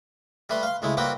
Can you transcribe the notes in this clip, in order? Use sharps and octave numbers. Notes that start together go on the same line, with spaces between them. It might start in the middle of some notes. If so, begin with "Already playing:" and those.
G3 A3 B4 C6
F5 C6
C#2 G#3 A3 E4
G3 A#3 C4 F#4 B4 G5